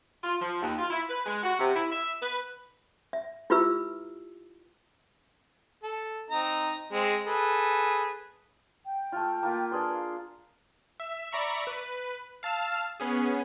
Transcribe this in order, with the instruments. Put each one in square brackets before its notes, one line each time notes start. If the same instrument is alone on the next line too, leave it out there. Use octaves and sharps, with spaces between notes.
[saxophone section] F4
F3
D#2
F4
E4
B4
G#3
F#4
C3
E4
E5
B4
[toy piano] E5
E4 F4 G4 B4 E5 E6
[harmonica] A4
C4 D#4 A#5
G#3 C4
G#4 A4 B4
[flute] G5
[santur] A3 F4
A#3 F4 B4
[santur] D4 G#4 C6 [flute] B4
[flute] F5
[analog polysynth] E5
D5 E5 A#5 B5 C#6
B4
F5 A5 E6 F6
B3 C#4 G#4